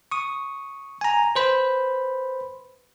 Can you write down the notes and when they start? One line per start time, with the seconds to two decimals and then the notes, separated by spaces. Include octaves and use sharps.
0.11 C#6 D#6
1.01 G#5 A#5
1.36 B4 C5 B5